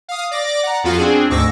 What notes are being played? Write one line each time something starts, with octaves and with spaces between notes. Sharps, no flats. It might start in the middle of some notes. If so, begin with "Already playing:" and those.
F5 D#6
D5 D6 A#6
F#5 A#5
F2 B3 F4 F#4 F5
C4 D4 G#4
D2 G#2 C#6 D6 E6 A#6